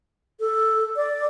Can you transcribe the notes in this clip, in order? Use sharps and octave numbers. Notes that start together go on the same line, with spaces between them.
A4
D5